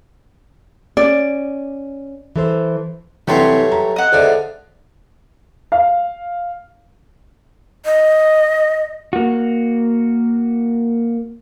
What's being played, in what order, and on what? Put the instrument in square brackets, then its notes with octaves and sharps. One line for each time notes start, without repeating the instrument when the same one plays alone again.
[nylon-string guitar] C#4 [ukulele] D5
[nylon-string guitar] E3 A4 C5
[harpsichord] G2 F#3 A3 [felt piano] C3 E3 [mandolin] G4 C#5 C6
[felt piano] A#5
[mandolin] D#5 F#5
[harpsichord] C#2 D3 [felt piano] C5 D5 E5
[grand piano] F5
[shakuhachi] D#5
[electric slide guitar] A#3 F#4